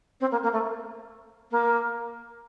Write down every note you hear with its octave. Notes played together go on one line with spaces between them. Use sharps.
C4
A#3
A#3
A3
A#3